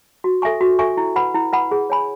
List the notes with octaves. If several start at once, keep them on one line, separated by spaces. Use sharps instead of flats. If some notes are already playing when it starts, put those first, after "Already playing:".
F#4
A4 E5 G#5 C#6
F#4
A4 E5 G#5 C#6
E4
B4 F#5 B5
E4
B4 F#5 B5
G#4
C#5 G#5 B5